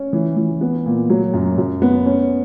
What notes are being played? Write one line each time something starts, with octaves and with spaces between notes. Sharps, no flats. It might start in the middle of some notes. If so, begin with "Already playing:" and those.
Already playing: C#4
E3
E3
B3
A#2
F#3
F#2
F#2
B3
C#4